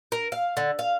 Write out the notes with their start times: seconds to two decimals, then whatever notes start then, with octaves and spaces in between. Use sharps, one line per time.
0.12 A#4
0.32 F5
0.57 D3
0.79 F5